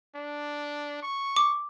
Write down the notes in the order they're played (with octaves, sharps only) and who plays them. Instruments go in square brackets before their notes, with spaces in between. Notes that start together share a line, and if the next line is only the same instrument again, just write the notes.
[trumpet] D4
C#6
[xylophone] D6